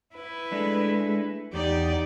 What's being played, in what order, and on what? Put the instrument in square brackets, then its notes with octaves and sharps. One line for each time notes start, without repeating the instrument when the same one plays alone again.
[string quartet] E4 [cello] B4
[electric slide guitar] G#3 A3 D4
[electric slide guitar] E2 [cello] D#4 G4 [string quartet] D5